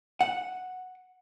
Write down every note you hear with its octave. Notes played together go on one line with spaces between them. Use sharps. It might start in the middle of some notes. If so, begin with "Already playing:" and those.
F#5